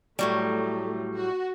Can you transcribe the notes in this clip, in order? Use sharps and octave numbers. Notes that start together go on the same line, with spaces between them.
A2 F#3 G3 A3
F#4